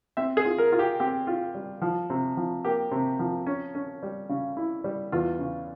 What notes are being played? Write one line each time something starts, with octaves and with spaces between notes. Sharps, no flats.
C4 E5
G#4
F4
A#4
F4
G4
C4 G4
F4
G3
F3
C3
F3
A#3 G4
C3
F3
C#4
C#4
G3
C#3
E4
G3
E2 F4
C#3